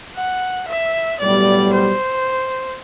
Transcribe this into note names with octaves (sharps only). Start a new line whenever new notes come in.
F#5
E5
B1 A2 G3 B3 D5
C5